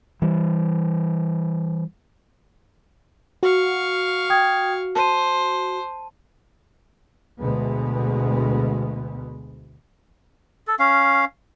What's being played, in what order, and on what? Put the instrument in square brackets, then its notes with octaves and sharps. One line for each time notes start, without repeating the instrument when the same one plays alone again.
[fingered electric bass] E3 G3
[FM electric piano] F#4 [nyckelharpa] F5 C#6
[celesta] G5 D#6 G#6
[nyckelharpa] C5 [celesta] A5 D#7
[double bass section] D2 B2 G#3 B3
[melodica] A4
C#4 F5